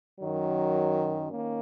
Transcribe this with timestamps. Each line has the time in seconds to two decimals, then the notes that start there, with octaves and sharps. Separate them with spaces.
0.18 F#2 D#3 F#3
1.32 D#3 A#3 C#4